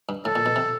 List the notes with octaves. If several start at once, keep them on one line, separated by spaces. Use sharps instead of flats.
G2
A2 A4
A#2
B2
C3